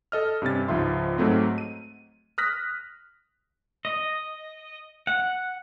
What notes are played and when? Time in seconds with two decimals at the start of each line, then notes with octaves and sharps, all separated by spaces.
0.12 A4 D#5 F6
0.42 G2 C3 C#4 A6
0.68 C#2 G#2 F3 E5 C6
1.18 G#2 F#3 A3 C4
1.58 D#7
2.38 D#6 F6 F#6 A#6 B6
3.85 D#5
5.07 F#5